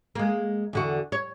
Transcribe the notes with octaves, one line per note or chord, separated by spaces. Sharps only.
G#3 A#3
E2 D3 F#4
C#5